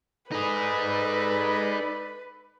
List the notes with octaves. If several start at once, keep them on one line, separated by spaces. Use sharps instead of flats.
D#4 G#4 A4 B4 D5 B5